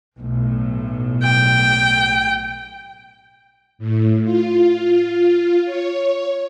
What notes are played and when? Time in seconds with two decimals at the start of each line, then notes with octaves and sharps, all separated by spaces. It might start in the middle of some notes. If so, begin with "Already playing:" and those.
0.18 B1 A2
1.24 G5
3.78 A2
4.24 F4
5.65 C#5